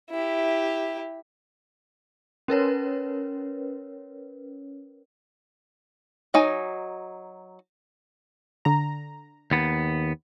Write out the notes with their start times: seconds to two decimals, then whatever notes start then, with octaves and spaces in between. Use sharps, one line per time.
0.10 E4 G4
2.48 C#4 A#4 B4 C#5
6.34 F#3 D#4 G#5
8.65 D3 A#5
9.51 D#2 B3